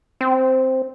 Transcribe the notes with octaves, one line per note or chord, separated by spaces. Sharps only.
C4